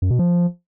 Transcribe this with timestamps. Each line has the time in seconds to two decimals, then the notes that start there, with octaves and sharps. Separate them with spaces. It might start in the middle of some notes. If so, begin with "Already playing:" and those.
0.02 F#2
0.11 B2
0.19 F3